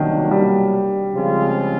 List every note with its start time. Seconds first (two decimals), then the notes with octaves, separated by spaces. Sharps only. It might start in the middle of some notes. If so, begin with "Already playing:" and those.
Already playing: C2 B2 D#3 F#3 A#3 D4
0.31 G3
1.15 C#3 F3 G#3 C4 F4